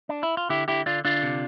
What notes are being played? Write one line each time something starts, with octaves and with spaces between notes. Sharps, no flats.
D4
E4
F4
D3 E4 G4
D3 E4 G4
D3 D4 F4
D3 D4 F4
C3